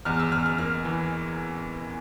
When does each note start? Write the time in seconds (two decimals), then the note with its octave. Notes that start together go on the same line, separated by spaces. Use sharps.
0.05 E2 F6
0.19 E6
0.32 E2 F6
0.46 F6
0.58 A#3 F6
0.85 E3